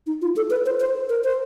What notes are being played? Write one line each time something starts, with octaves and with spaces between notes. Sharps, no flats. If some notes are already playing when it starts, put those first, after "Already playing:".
D#4
F4
A4
B4
C5
C5
A#4
C5